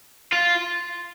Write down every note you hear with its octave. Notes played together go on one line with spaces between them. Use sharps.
F4